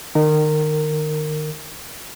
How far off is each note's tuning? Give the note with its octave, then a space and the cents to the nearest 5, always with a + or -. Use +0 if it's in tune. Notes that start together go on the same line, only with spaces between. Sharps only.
D#3 -35 A#4 -20